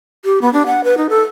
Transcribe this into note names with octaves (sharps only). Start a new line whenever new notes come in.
G4
B3
D4
F#5
B4
D#4
A4